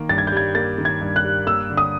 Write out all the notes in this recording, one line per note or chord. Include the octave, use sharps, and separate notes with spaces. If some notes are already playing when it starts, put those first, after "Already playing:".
Already playing: D#3 A#3
G2 A6
G#6
G6
G3 G#6
A#3 A6
D#3
G#6
G2
F#6
G3
A#3 E6
D3
D#6